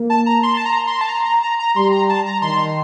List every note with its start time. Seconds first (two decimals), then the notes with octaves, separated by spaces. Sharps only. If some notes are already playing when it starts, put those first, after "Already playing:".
Already playing: A#3
0.10 A5
0.26 A#5
0.43 C6
0.57 A5
0.65 A#5
0.87 C6
1.01 A5
1.09 A#5
1.25 A#5
1.43 A#5
1.59 A#5
1.76 G3 C6
1.92 A#5
2.09 A5
2.26 A#5
2.42 D#3 C6